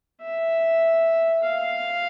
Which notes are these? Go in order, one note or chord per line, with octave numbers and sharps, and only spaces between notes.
E5
F5